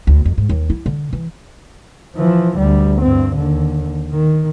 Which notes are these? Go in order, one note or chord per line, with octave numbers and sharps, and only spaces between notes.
D2
F2
G#2
D#2
E4
D3
E3
E3 F3
D2 G3
G2 C4
D#2 D3
D#3